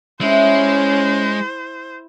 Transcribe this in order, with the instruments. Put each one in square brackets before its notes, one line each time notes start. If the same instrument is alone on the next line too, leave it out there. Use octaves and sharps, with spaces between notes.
[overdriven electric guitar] G#3 [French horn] C#4 [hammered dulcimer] E4 E5 [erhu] C5